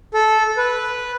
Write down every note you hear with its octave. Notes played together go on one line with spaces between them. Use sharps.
A4
B4